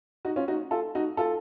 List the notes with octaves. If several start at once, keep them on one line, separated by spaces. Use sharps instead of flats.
D#4 F#4
C#4 F4
D#4 F#4
F4 A4
D#4 F#4
F4 A4